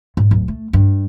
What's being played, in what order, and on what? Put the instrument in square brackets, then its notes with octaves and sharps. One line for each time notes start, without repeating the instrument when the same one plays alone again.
[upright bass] G#2
D1
A3
G2